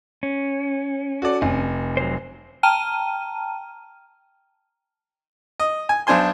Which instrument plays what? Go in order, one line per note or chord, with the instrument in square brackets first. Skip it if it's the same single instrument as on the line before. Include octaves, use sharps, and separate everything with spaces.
[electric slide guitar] C#4
[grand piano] F#4 A4 D5
F1 G#5
[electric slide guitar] F#3 C5
[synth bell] G5 A5 A#5 F6 D#7
[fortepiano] D#5
G#5
B1 D4 C5 G#5 C6